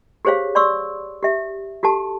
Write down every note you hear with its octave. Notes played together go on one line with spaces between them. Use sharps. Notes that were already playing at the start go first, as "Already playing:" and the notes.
G4 G#4 C5 C#5 F5
D5 C6 C#6 E6
G4 E5
F#4 G4 A4 A5